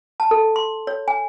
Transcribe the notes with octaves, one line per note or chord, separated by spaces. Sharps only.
A5
A4
C6
C#5
G#5